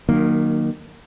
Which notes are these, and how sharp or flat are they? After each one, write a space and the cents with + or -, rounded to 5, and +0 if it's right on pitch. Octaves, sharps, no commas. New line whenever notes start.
D#3 -25 F#3 +0 A#3 +0